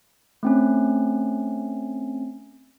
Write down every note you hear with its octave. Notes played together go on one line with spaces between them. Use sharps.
A3 C4 C#4